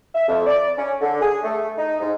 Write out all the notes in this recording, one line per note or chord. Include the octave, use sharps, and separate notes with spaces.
E5
F2
D5
C#4
D3
G#4
A3
D#4
G#2